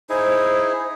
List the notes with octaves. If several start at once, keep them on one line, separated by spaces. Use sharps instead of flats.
D#4 E4 G#4 C5